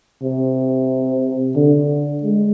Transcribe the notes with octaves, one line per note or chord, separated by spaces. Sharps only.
C3
D3
G#3